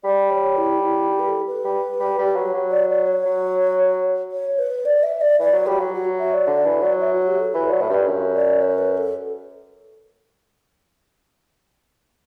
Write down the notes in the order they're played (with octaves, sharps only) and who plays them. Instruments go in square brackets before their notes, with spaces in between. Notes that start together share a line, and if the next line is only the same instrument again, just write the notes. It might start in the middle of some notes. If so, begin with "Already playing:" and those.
[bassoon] G3 [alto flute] D5
[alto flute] C#5
E4
E4
G4
B4
A4
B4
[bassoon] G3
G3
G3
F#3
F#3
[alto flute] D5
D5
C#5
[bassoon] F#3
[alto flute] C#5
B4
D5
E5
D5
[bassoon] E3 [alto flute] D5
[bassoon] F#3
[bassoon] G3 [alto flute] F#4
[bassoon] F#3
[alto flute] F#4
E5
D5
[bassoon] D3
E3
F#3
[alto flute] E5
F#4
G4
A4
[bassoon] E3 [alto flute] C#5
[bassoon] F#3 [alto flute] D5
[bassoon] A2 [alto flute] E5
[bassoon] G2 [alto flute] D5
[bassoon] F#2
[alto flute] D5
C#5
B4
A4